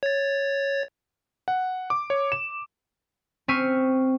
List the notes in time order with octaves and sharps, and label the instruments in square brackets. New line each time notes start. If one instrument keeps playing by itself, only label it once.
[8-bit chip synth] C#5 A6
[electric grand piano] F#5
D6
C#5
E7
[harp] C4 C#6 F6 B6 D#7